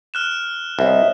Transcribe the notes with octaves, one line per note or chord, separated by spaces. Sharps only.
F6 F#6 E7
C2 C#5 D#5 E5